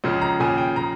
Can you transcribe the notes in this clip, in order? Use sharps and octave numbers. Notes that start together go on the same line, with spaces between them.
C#2 C#3 F3
A#5
D#2 C#3 F3 G#5
G5
C#3 F3 A#5